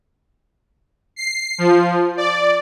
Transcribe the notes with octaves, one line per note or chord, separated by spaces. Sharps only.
C7
F3
D5